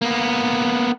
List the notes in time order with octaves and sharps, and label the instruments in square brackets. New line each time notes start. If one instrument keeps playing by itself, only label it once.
[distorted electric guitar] A#3 B3